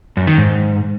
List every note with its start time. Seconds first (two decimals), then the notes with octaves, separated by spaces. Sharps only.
0.17 F#2
0.27 D#3
0.38 G#2